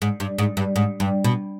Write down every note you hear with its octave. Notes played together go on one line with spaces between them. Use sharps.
G#2
G2
G#2
G2
G#2
G2
B2